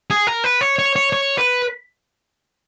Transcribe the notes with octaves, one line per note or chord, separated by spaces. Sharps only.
G#4
A#4
B4
C#5
C#5
C#5
C#5
B4